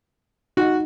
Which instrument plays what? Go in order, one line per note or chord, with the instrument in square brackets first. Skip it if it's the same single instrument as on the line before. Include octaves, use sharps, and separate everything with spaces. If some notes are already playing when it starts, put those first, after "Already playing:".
[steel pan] D#4 [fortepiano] F#4